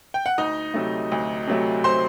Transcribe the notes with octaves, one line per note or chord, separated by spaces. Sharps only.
G5
F#5
D2 D#4 D#5
C3 F#3 A3
D2
C3 F#3 A3
C5 C6